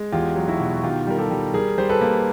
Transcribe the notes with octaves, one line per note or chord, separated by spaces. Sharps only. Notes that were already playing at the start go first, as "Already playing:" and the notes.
Already playing: G#3
E2 F4 G4
F#3
E4 F#4
B2
F#4
D#3 F4 G4
G3 A#4
G4 A4
G3
G3 G#4 A#4
G3 C5
A4 B4
A#3